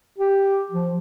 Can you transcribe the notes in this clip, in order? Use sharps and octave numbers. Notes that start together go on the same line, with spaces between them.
G4
F3